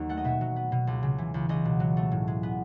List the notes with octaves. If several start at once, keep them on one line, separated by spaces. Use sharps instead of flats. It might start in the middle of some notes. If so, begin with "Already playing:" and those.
Already playing: D#2 F#3
A3 F#5
D#5
B2 E5
F#3
B3
B2
C#2
C#3
E3
C#2
C#2 D#5
B2
F#3
A3
A2
G#3
B3